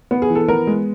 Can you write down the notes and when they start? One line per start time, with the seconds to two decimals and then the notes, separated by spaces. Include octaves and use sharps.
0.11 B3
0.22 G#4
0.30 E3
0.35 A4
0.48 B3 A#4
0.67 G#3